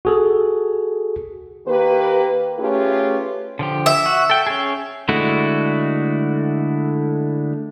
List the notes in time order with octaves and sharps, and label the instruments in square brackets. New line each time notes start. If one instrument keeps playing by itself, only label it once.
[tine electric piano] F#4 G#4 A4
[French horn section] D#3 A#3 G4 B4
A3 C#4 F4 G4 G#4 B4
[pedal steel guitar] D3 F3 G4
[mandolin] E5
[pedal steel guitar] F#4
A4 G5
C#4 G#4
D3 G#3 A3 E4 F#4